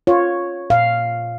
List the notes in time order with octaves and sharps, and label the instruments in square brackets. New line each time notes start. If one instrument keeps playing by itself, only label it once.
[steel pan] F4 [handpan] C#5
[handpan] A#2 F5